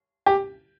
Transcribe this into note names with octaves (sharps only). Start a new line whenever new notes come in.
G4